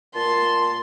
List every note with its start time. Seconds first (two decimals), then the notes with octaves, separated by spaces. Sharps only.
0.15 A#2 A5 C6